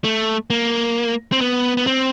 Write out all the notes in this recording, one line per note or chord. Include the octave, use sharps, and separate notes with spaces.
A3
A#3
C4
B3
B3
C4